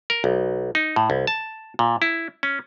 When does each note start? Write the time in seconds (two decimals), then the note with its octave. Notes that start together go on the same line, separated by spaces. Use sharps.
0.10 A#4
0.24 B1
0.75 D#4
0.96 A2
1.10 C2
1.27 A5
1.79 A#2
2.02 E4
2.43 C#4